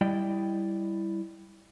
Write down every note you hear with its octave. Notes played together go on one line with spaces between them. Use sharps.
G3 E4 D5 D#5 G5